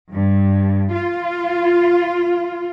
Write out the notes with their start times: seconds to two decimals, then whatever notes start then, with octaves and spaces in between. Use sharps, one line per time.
0.13 G2
0.93 F4